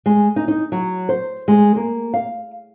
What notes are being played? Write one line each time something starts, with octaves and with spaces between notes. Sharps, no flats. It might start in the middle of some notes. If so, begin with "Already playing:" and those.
G#3
D#4
D#4
F#3
C5
G#3
A#3
F5